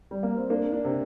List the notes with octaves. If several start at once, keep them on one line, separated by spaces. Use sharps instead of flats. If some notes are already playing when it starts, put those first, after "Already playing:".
G3
A#3
C4
A#3 D4
D4
C3